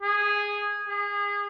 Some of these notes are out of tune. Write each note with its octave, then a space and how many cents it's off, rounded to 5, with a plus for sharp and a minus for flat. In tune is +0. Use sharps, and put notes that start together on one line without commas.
G#4 -10
G#4 -30